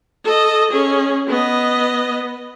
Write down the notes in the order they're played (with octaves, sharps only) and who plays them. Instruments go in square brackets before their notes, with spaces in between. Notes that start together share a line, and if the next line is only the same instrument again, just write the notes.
[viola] A4 D#5
C#4 G#4
B3 D#5